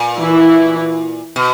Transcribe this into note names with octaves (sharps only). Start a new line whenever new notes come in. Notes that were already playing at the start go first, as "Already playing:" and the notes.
Already playing: A#2
E3 E4
B2